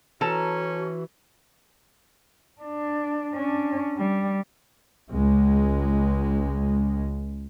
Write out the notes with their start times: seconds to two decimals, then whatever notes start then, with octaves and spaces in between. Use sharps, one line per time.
0.21 E3 C#4 F#4 A4 A5 A#5
2.62 D4
3.35 C#4 D4
3.98 G3
5.12 C#2 G#3